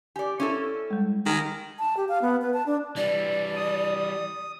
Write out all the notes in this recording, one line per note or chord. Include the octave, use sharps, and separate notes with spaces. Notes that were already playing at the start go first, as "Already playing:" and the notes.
G4 D5 G#5
C#4 E4 A4
G3 G#3
D#3 G#4
A5
G4
F5
B3
B4
A5
D4
E3 G3 D5
D#6